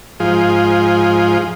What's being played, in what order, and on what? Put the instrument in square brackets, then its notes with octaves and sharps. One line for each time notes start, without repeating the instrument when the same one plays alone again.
[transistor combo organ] G#2 F3 F4 G#4